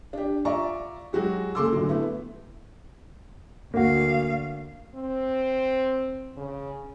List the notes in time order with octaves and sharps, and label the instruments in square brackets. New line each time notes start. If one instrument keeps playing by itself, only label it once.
[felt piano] D4 G4
F4 D5 E5 A#5 C#6
F#3 G#3 F#4 G4
F#1 C#3 A4 C6 D6 E6
A2 D3 F#3
A3 B3 E4
[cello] D2 F5 [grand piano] A#3 F#4
[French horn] C4
C#3